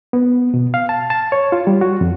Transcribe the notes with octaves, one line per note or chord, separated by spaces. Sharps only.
B3
B2
F5
A5
A5
C#5
F4
G3
F#4
F2